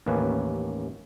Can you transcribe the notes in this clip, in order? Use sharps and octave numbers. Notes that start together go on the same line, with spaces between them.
A1 D#2 A#3 C#4 B4